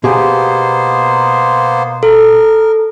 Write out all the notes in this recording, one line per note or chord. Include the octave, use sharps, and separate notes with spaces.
B2 A#3 B3 G4 G#4 C5
A4 A#4